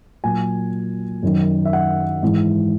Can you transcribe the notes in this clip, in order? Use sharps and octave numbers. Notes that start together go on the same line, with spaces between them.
A#2 F#3 G#5
F#2 D#3 F#3
E5
F#5
G#2 E3